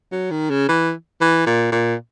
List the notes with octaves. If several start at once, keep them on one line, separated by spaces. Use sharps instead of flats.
F#3
D#3
C#3
E3
E3
A#2
A#2